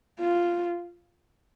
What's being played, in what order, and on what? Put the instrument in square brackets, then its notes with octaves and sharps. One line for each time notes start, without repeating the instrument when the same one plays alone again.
[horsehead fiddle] F4